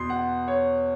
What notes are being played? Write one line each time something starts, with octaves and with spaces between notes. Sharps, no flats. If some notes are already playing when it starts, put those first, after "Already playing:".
Already playing: E2 B2 C6
F#5
C#5